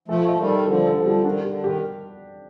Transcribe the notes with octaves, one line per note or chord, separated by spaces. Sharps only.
F3 A3 A4
A3 D#5
D#3 G3
A4
D3 F3 G3
A4
D3 F3
G3
D#3 D4
D3 G4
D#3 G4